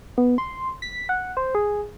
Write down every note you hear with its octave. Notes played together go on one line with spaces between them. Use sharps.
B3
C6
B6
F#5
C5
G#4